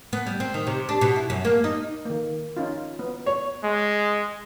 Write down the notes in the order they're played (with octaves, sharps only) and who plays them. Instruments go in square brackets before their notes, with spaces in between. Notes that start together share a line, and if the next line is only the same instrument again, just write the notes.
[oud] B3
G3
C4
D#3
C3
D4
B2
E4
F#2
A#3
D#4
[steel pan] D#3 A#3
C#4 D#4 F4
B3
[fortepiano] C#5
[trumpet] G#3